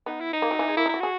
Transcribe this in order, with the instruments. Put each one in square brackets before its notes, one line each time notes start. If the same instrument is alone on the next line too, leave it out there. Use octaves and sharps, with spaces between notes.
[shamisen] B3 [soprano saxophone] D#4
[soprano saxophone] E4
D#4
[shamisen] A#3
F#3
E3
G#3
[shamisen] A#3 [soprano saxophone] E4
[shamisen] D#4
[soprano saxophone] E4 [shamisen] F#4
[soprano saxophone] F#4 [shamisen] G#4